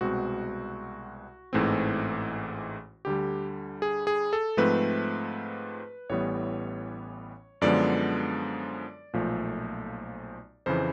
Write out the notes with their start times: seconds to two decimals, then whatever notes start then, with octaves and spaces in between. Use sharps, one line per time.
0.01 C2 B2 G#3 C4 F#4
1.53 A1 G#2 E3 A3 C4
3.05 D2 D3 G3 G4
3.82 G#4
4.07 G#4
4.33 A4
4.57 G#2 F3 A3 C4 B4
6.09 A1 A2 E3 G3 B3 C#5
7.61 F#2 D3 F3 G#3 B3 D5
9.14 B1 A#2 F3 A3
10.66 F2 C#3 E3 C5